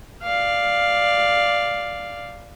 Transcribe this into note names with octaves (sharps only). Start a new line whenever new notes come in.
D5 F5